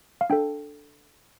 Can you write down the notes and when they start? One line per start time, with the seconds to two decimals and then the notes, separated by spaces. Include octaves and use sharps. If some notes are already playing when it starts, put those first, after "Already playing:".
0.21 F5
0.30 D4 A4 G5